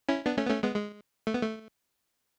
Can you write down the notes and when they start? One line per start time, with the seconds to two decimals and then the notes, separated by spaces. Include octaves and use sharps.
0.09 C#4 E4
0.26 B3 D4
0.37 A3 C#4
0.46 B3
0.50 A3 C#4
0.63 G#3 B3
0.76 G#3
1.27 A3
1.34 B3
1.43 A3